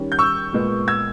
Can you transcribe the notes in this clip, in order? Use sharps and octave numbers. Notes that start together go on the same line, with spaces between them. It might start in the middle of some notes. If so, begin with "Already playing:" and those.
Already playing: D#3 G3 C#4
G6
C#6 E6
A#2 G#3 B3
E6 G#6